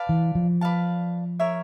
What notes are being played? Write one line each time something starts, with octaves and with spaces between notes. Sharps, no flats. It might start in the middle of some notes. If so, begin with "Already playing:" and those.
Already playing: B4 D5 F5 A5
E3
F3
B4 D5 F5 A5
A#4 C#5 E5